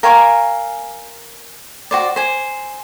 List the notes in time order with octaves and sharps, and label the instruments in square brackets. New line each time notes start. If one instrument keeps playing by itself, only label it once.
[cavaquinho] A#4 F5 G#5 C#6
F#4 C5 D5
C5 G#5